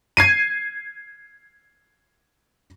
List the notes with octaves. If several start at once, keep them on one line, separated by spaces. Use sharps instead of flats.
G#6 C7 D#7